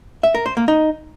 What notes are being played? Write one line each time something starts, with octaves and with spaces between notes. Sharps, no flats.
E5
A#4
C5
A#3
D#4